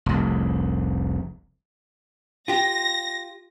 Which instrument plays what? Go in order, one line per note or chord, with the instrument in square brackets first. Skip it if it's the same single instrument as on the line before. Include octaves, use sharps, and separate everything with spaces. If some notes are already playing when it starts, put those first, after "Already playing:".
[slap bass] F1 C2
[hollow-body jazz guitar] F4 G4 [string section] A#6